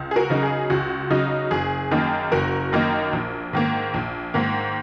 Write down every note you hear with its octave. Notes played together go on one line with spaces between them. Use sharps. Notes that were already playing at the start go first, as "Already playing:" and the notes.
Already playing: C#2
G#4
F#4 A#4
C#3 F#3 D#4
G#4
C#2 F#4
C#3 F#3 D#4
F#1 G#4
F#2 D#3 A#3 D#4
F#1 F#4 A#4
F#2 D#3 A#3 D#4
A#1
G#2 D#3 A#3
A#1
G#2 D#3 A#3